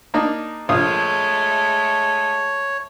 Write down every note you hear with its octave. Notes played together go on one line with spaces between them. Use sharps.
A#3 D4 D#4
A#1 G#3 A3 F4 C#5 D#6